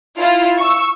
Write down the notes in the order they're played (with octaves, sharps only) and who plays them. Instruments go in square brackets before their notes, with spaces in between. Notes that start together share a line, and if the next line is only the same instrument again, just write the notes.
[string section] E4 F4
C#6 E6